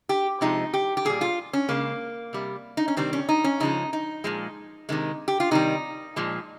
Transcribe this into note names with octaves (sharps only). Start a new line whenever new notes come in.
G4
C3 F3 G#3 D#4
G4
G4
A#2 G3 G#4
F4
C#4
C#3 G#3 A#3
C3 G3
D#4
C#4
C3 D#3 G3 C4
C#4
D#4
C#4
C#3 F3 G#3 D#4
D#4
A#2 F3 G#3
C3 D#3 G#3
G4
F4
C3 D#3 G3 D#4
A#2 F3 G#3